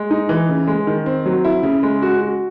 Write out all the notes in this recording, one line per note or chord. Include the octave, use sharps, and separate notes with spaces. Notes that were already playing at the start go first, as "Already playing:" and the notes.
Already playing: G#3
D#4
E3
C#3
G#3
D#3
C4
F#3
E4
C#3
G#3
F#4
F#4